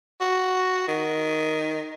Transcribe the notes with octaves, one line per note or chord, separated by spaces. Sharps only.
F#4
D#3